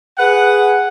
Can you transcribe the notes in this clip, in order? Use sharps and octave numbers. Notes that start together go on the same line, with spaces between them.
G#4 B4 F#5